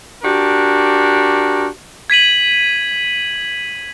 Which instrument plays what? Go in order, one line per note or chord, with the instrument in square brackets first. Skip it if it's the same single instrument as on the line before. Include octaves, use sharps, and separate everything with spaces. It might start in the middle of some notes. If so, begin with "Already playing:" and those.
[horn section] D4 F#4 G4 A#4
[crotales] G#6 B6 D#7 F#7